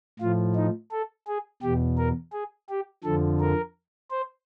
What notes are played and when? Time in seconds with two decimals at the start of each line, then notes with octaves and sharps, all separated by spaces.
0.19 A2 F3 F4
0.56 D#4
0.91 A4
1.27 G#4
1.62 E2 B2 G4
1.97 A#4
2.33 G#4
2.69 G4
3.04 F2 D3 F3 A4
3.40 A#4
4.11 C5